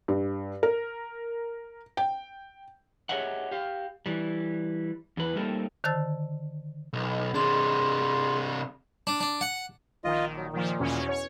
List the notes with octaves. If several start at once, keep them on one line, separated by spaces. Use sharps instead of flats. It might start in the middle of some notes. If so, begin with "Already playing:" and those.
G2
A#4
G5
G4 G#4 C#5 D#5 E5 F#5
G4 F5
E3 G3
E2 E3 B4
G3 A3 A#3 C4 D#4 A4
D3 D#3 C5 A5 E6 A6
B1
C3 D4 G#4 C6
D4
D4
F#5
A#1 D#3 F4 D#5
F#3
A#2 D#3 F3
E2 B2 C#4
C#5